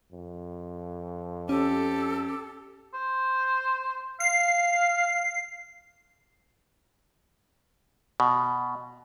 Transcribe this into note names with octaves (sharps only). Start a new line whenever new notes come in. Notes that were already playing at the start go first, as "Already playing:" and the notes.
F2
C#4 G4 A4
C5
F5 C7
B2